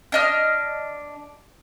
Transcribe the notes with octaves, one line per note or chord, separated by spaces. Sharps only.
D4 D#5 F6